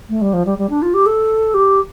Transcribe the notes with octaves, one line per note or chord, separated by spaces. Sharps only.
A3
G3
F3
G3
G3
D4
F4
G4
A4
G4